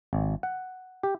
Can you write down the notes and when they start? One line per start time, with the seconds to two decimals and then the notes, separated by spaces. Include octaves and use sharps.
0.13 G#1
0.43 F#5
1.03 G4